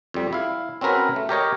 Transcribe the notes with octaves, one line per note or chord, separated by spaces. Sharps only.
F2 G3
E4 F5
C4 C#4 F#4 A#4 B4 C#5
A3
G4 A#4 C#5 D#5